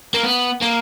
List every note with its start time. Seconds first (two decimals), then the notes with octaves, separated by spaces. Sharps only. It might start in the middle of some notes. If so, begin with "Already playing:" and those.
0.14 A#3
0.24 B3
0.62 A#3